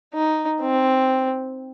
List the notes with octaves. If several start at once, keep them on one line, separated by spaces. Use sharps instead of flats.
D#4
C4